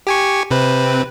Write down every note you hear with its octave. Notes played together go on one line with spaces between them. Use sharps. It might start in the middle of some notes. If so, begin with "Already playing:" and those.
G4 G#5 C#6
C3 C4 B4